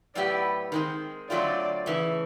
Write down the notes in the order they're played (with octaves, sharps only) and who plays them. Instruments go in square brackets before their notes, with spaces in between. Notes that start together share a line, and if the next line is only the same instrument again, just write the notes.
[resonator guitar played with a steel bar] A2 F#3 B3 E4 G4 [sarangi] D5
[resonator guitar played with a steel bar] D#3 G#3 C4
[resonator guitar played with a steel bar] D3 F#3 A3 C4 F4 [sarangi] D5
[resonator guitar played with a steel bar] C#3 E3 A3